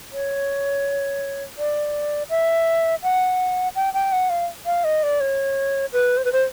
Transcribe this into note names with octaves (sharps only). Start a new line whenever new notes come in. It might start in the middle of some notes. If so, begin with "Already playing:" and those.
C#5
D5
E5
F#5
G5
G5
F#5
F5
F5
D#5
D5
C#5
B4
C5
B4
C5